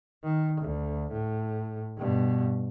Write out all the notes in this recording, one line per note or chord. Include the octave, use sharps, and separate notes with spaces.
D#3
D2
A2
G2 B2